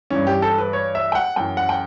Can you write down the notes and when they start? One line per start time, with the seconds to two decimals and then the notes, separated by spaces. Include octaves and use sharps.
0.11 G2 E3 C#4
0.27 G4
0.42 A4
0.58 B4
0.73 C#5
0.95 E5
1.12 G5
1.15 F#5
1.36 F#2 E3 G5
1.57 F#5
1.69 G5